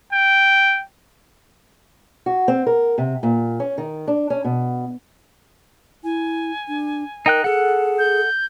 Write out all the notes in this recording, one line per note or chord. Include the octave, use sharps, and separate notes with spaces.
G5
F#4
C4
A#4
C3
A#2
C#4
D#3
D4
C#4
B2
E4 G#5
D4
D#4 A#4 G5 F#6
G#4 A4 F#5
G6